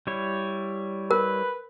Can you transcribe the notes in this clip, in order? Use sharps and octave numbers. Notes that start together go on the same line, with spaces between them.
G3 E4 C#5
A#4 B4